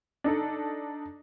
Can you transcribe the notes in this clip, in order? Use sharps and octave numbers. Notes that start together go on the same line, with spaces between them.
D4 D#4 A4